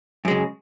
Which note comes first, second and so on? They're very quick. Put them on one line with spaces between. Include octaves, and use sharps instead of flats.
F#2 G#3 C#3